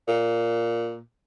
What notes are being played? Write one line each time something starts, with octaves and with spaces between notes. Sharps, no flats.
A#2